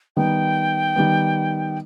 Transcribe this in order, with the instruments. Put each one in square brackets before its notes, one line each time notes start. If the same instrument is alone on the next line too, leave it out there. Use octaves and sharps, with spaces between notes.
[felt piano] D#3 G3 B3 [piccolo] G5
[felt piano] D#3 G3 B3